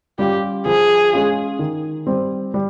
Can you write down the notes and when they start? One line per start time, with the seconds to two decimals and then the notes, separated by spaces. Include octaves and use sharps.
0.19 G3 C#4 F4 G4
0.66 F3 G#4
1.13 G#3 C#4 F4
1.59 D#3
2.07 G3 C4
2.54 G3